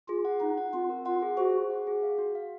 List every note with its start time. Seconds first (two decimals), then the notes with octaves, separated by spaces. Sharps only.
0.08 F4 G#4
0.25 F#5
0.41 D#4 F4
0.58 F#5
0.73 C4 F4
0.89 A#4
1.06 F4 F#5
1.22 G#4
1.37 F#4 C5
1.54 G#4
1.70 F#5
1.87 G#4
2.03 F5
2.18 F#4
2.35 F5